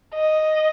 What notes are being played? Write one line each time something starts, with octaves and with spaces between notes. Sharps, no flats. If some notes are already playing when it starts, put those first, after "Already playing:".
D#5